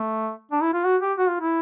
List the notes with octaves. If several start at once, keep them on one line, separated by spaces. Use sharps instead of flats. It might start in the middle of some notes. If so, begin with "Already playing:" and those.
Already playing: A3
D4
E4
F4
F#4
G4
F#4
F4
E4